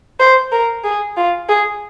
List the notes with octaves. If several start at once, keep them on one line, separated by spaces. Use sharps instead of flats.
C5
A#4
G#4
F4
G#4